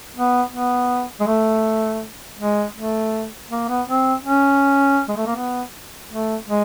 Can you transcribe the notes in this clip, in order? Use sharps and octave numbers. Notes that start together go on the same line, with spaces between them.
B3
B3
G#3
A3
G#3
A3
A#3
B3
C4
C#4
G#3
A3
A#3
B3
A3
G#3